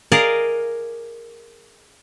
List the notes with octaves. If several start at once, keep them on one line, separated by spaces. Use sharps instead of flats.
G#4 A#4 D5 D#5 F5